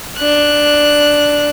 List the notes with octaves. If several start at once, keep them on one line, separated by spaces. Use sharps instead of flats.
D4 F#6